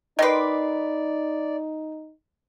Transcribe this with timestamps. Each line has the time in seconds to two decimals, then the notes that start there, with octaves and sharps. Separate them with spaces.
0.19 D#3 D#4 B4 D5 D#5 C6 D6